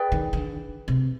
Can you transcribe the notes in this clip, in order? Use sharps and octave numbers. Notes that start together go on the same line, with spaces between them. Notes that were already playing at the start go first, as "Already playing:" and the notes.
Already playing: G#4 B4 D5 G5
D#3
D#3
D3
C3